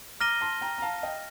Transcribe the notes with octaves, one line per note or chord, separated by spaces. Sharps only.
A#5 D6 F6 A#6 D#7 G7
A5 C6
G5 A#5
A#5
F5 A5
D#5 G5